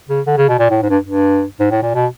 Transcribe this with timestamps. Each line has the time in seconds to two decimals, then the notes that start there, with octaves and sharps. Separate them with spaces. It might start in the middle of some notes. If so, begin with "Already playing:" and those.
0.09 C#3
0.27 D3
0.37 C#3
0.49 B2
0.59 A#2
0.70 A2
0.83 G#2
0.90 G2
1.06 G2
1.60 G#2
1.71 A2
1.83 A#2
1.95 B2